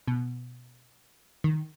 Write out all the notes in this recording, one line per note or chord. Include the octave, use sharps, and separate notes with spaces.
B2
D#3